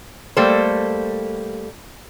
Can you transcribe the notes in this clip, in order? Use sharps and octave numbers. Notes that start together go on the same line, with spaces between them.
G3 A3 A#3 A4 C5